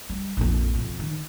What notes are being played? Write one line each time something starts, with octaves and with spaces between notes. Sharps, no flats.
G3
A#1 F2
F2 B2
D#3